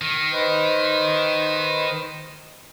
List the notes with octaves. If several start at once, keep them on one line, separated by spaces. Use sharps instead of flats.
D#3
D#4 B4 C5